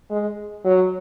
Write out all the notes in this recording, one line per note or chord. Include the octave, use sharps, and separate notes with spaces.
G#3
F#3